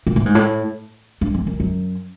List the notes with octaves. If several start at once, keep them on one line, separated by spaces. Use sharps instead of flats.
A#2
A2
G#2
A2
G2
F2
F#2
F#2